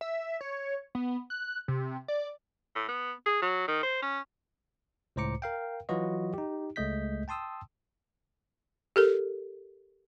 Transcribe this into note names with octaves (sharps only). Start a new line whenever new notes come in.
E5
C#5
B3
F#6
C3
D5
A2
B3
G#4
F#3
D#3
C5
C#4
C#2 A2 C5 A#5 D6 C#7
A#4 F5 G5
E3 F#3 F4 F#4 B4 D#5
D#4 G4
C#2 G#3 A3 D#5 G6 B6
G5 A5 C6 D#6 E6
G4 A4 A#4